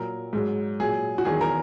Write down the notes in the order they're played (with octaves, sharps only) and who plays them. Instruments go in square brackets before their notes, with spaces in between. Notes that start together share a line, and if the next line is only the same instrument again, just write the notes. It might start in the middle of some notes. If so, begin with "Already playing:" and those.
Already playing: [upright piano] A#2 F#3 A#4
G#2 F#3
A#2 F#3 G#4
F#4
E2 D#3 F#3 G#4
A#4